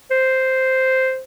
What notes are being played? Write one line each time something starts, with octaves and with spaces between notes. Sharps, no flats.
C5